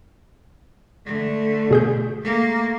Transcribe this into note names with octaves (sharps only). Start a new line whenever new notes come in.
D3 A3
B2 G#4 G6
A3 A#3